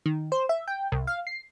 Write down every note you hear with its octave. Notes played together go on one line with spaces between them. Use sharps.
D#3
C5
E5
G5
C2
F5
C7